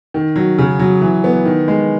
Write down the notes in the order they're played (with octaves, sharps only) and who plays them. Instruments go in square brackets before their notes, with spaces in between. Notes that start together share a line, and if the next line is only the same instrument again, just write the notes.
[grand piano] D#3
F#3
C#3
F#3
E3
B3
D#3
G#3